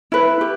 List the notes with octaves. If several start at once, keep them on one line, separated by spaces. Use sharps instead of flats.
E4 B4
G4